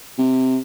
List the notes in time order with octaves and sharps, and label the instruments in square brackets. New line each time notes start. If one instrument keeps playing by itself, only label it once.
[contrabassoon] C3